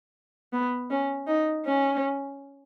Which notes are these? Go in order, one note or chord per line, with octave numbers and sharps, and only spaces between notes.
B3
C#4
D#4
C#4